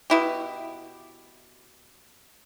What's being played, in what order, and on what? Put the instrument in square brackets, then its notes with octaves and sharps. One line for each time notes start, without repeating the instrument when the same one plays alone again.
[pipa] B2 E4 G4